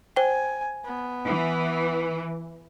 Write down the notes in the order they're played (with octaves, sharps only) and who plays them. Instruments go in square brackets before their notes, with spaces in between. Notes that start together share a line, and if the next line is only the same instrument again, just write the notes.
[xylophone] C5 G5 [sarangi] G#5
[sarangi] B3
[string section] E3